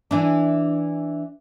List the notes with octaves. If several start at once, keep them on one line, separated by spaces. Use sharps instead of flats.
E3 D4